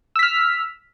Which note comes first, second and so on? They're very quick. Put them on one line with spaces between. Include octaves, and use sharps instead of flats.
E6 B6 F6